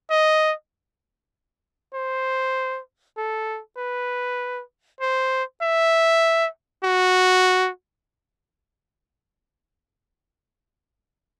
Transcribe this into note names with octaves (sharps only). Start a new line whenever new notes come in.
D#5
C5
A4
B4
C5
E5
F#4